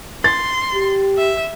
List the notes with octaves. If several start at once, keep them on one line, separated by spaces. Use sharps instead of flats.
C6 A6
G4
E5